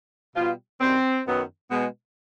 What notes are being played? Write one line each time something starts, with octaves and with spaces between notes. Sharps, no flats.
B2 G3 B3 F4
F#2 D#3 G3 C4
F#2 D#3 F#3 B3
B2 G#3 B3